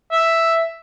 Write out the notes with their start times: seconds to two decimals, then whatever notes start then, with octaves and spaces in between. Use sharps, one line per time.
0.12 E5